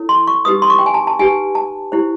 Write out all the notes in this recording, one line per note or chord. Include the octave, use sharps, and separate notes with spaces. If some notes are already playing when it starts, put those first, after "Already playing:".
Already playing: E4 A4 C#5
C6
C#6
D#4 G4 B4 D#6
C6
C#6
G5
G#5
A5
A5
D#4 G4 B4 G#5
A5
E4 G4 C5